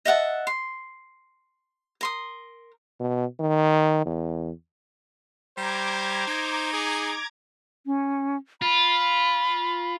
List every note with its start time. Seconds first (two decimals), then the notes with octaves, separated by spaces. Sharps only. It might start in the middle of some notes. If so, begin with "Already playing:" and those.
0.05 D#5 E5 F#5 A5
0.47 C6
2.01 A#4 C6 D#6
3.00 B2
3.40 D#3
4.06 E2
5.57 G3 C5 A#5 D6 G#6
6.27 D#4
6.73 G#4
7.86 C#4
8.62 F4 B5